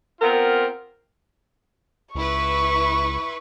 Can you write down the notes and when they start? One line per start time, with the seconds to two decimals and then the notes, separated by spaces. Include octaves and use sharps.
0.21 B3 C4 F4 A#4
2.15 C#2 E4 B4 C#6